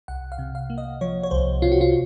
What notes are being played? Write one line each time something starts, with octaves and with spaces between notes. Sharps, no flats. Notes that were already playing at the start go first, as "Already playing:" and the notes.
C2 F#5
F5
C3
F5
A#3
D#5
F3 C#5
C#5
C2 C5
C3 F4
F#4
F4